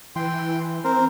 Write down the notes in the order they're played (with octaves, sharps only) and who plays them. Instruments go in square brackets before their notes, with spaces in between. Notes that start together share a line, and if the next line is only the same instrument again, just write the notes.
[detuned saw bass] E3 [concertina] G5 C6
[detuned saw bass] C4 [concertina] A#4 C5